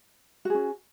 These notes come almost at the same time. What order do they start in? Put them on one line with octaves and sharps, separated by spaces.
F#4 G#4 C#4